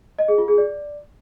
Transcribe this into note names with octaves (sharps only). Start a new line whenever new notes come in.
D#5
G#4
F4
G#4
D5